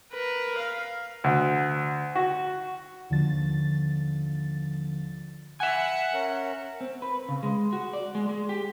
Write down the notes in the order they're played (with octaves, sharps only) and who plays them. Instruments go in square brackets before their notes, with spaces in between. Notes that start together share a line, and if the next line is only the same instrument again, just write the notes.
[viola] A#4 B4
F5
[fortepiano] D2
F#4
[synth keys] D#2 D3 F3 A6
[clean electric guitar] E5 G#5 [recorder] F#5
[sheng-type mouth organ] C#4 A#4
[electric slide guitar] C4
B4
C#3
G#3
F#4
D5
G#3
G#3
G4